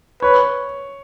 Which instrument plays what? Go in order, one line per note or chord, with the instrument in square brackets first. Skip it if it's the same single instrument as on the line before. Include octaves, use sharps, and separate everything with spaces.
[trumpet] B4 [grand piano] C#5